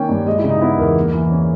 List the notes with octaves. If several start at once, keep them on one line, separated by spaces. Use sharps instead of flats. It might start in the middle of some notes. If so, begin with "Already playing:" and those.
Already playing: D#3 A#3 C#4 G5
G2
G#3 D#5
E4
C#3
D#4
B3 E4
E2 A#4
A#3
E3
C#4